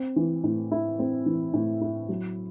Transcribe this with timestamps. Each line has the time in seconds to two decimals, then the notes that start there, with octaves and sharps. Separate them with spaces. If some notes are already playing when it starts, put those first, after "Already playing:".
Already playing: C4
0.16 E3
0.44 A2
0.72 E4
0.99 C4
1.26 E3
1.54 A2
1.81 E4
2.09 F#3